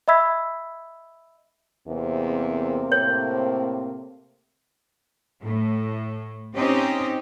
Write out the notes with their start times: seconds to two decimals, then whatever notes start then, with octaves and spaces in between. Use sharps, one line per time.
0.08 D#5 E5 B5 E6 G#6 B6
1.87 E2 C3 A#3 C4
2.92 A2 C#5
5.44 A2
6.55 C4 C#4 D#4 G4 D#5